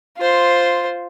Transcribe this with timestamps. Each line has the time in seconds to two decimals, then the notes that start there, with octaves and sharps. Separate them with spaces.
0.17 F4 C5